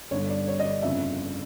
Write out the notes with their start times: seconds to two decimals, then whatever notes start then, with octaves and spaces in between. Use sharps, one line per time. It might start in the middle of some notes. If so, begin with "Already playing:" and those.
0.11 G1 G2 D3 C#5
0.30 D5
0.48 C#5
0.60 D#5
0.65 D5
0.82 G1 F2 C#3 E5